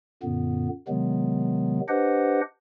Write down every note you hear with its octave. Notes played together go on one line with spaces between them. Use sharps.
F#2 A#2 D3 B3
C3 D#3 F#3 G#3 B3
D4 G4 B4 C5 D#5 F#5